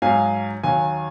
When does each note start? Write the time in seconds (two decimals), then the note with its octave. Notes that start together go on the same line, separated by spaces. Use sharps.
0.02 G#2 F#3 F5 G#5
0.63 D#2 D#3 F#3 F5 G#5